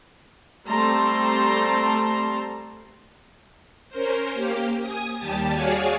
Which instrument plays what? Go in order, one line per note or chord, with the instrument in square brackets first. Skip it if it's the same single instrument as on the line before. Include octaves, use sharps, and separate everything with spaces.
[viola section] G3 A3 C4 A5 A#5 C6
[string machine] C#4 A#4 C5
A#3 G4
G#5 D#6
D#2 G3 G4 A5
F#4 G#4 C#5 D5 F5 G#5